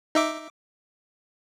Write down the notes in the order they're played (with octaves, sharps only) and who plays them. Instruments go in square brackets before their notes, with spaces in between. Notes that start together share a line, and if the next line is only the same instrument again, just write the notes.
[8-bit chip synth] D#4 E5 D6